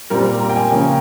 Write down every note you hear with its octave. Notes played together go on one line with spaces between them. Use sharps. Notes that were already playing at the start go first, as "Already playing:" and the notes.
A#2 G3 C4 A#4
A#5
G5
G#5
C#3 F3 A#3 C#4